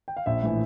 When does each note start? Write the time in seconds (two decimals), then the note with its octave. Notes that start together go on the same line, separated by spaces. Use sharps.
0.08 G5
0.17 F5
0.26 A#1 E5
0.43 A2 E3